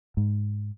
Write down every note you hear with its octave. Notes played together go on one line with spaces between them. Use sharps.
G#2